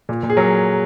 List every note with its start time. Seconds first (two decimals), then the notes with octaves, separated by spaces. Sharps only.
0.09 A#2
0.23 A#2
0.30 G#4
0.37 F#3 A#4